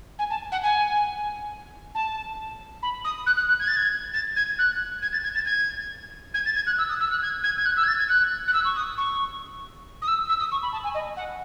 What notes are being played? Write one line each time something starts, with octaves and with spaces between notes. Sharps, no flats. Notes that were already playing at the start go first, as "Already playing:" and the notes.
G#5
A5
F#5
G#5
A5
B5
D#6
F#6
F#6
F#6
G#6
A6
G#6
A6
G#6
F#6
G#6
A6
G#6
A6
G#6
G#6
A6
G#6
F#6
E6
D#6
E6
F#6
G#6
G#6
G#6
F#6
E6
G#6
A6
G#6
F#6
F#6
E6
C#6
D#6
C#6
D#6
E6
E6
D#6
C#6
B5
A5
G#5
D#5
F#5